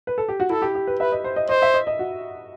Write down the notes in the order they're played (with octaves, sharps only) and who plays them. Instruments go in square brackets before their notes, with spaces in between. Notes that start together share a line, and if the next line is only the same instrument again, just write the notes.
[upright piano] B4
A4
G4
F#4
[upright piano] E4 [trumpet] A4
[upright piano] G4
G4
B4
[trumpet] B4 [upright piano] E5
[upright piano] D#5
C5
D#5
[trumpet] C5 [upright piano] D#5
[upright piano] E5
D#5
D#5
F#4